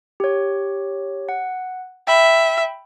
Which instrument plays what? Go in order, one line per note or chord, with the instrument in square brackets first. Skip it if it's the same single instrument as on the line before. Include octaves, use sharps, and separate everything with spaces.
[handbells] G4 C#5
F#5
[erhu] E5 [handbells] G5 B5